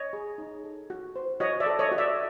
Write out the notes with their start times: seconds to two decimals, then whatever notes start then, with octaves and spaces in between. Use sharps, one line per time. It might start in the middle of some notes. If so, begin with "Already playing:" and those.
Already playing: C#5 D#5
0.13 G#4
0.38 D#4
0.64 A4
0.90 F#4
1.16 C5
1.40 F#4 C#5 D#5
1.60 D5 E5
1.66 A4
1.79 C#5 D#5
1.92 F#4
1.98 D5 E5